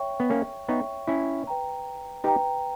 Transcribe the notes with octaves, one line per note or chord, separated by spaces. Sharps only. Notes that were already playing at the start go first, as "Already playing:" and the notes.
Already playing: C#5 E5 G5 C#6
B3
A#3 C#4
B3 D#4 C#5 E5 G5 C#6
C#4 E4
B4 G5 A#5
D#4 G4 B4 G5 A#5